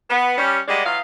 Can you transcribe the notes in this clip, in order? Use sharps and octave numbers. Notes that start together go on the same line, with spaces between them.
B3
G3 C#4
G3 G#3 A#3 D5 D#5 F#5
E3 F#3 D#5 F5